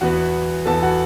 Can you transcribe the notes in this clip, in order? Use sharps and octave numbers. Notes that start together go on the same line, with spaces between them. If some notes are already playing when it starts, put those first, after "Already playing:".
E2 E3 B3 F#4 F#5
E2 E3 B3 A4 A5
F#4 F#5